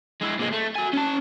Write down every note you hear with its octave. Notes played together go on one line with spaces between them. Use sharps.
G#3 E4
A#2 G#3
A3
F#4 G#5
C#4 A5